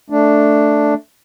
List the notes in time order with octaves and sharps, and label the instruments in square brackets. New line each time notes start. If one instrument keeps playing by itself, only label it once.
[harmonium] A3 D4